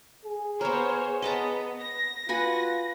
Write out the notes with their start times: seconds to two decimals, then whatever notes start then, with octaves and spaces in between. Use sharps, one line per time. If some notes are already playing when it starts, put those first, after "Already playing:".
0.25 G#4
0.61 B3 A#4 C5 C#5
1.22 B3 D#5 A5 A#5
1.81 A#6
2.29 F4 F#4 B4 G#5